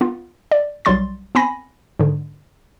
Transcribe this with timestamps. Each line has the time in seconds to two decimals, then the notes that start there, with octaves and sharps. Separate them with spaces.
0.01 B3 F4
0.51 D5
0.85 B1 F#3 G3 C6 A6
1.35 B3 C4 G#5 B5 A#6
1.99 G#2 D3